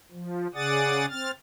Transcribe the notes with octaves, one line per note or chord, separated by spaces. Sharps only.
F3
C#3 G#4 D5 F#5 D#6 A6
C4 F6 A6